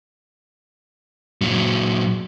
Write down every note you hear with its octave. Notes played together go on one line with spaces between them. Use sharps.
A#2 F#3